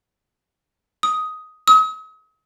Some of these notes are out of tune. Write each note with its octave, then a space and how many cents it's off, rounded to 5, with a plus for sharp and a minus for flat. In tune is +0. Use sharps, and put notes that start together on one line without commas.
D#6 +10
D#6 +40